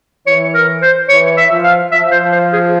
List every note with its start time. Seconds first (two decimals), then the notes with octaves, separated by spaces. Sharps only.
0.27 E3 C#5
0.54 A#4
0.82 C5
1.09 E3 C#5
1.37 E5
1.50 F3
1.64 F5
1.91 F3 E5
2.12 C5
2.32 C5
2.53 G#4